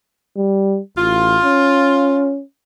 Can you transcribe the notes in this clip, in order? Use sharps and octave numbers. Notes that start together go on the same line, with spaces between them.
G3
A1 F4
C#4